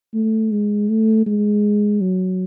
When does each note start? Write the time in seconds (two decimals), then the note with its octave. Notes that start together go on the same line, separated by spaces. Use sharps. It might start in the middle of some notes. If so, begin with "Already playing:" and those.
0.14 A3
0.51 G#3
0.89 A3
1.26 G#3
2.01 F#3